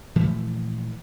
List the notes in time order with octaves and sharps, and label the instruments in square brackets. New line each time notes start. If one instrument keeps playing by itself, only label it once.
[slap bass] A#2 E3 F3 A3